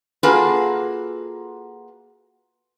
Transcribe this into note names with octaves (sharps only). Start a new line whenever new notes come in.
A#3 F4 F#4 G#4 A4 B4